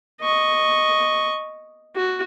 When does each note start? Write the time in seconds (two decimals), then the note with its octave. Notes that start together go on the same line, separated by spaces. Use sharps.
0.21 D#5 C#6
1.96 F#4